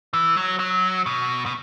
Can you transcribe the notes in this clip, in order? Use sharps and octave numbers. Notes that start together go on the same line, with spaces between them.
E3
F#3
F#3
B2
B2